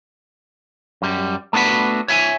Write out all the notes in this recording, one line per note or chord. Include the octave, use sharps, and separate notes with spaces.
F#2 G3
A3 B3 D4 F#4 B4
C#5 E5 F#5 G#5